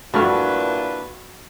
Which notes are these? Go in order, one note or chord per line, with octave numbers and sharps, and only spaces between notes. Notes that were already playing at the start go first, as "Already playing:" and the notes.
G2 A#2 A3 D4 E4 F#4 B4 F6